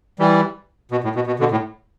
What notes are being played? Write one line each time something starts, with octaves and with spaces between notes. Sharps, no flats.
E3 G3
B2
A2
B2
B2
B2 D3
A2